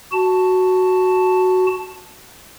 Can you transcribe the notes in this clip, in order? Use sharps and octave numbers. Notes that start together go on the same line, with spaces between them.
F#4 A5